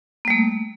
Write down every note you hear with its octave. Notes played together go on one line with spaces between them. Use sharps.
G3 A3 A#3